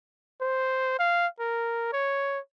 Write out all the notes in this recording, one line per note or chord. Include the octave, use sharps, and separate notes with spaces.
C5
F5
A#4
C#5